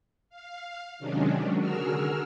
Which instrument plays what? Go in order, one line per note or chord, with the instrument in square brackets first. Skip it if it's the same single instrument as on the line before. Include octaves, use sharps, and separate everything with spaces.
[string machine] F5
C3 D#3 F#3 G#3 C#4 D4
D3 F#4 G#4 A#4 E6 F6